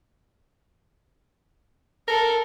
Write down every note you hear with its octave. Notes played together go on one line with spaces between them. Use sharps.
A4 A#4